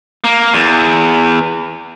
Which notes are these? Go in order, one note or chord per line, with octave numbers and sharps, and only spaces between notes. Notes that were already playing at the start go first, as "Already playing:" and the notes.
A#3
E2